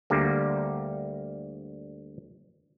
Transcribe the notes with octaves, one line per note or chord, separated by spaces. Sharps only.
D2 D3 G3 A#3